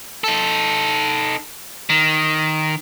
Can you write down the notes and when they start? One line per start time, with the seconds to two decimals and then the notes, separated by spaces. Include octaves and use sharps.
0.24 D#4 A4
1.90 D#3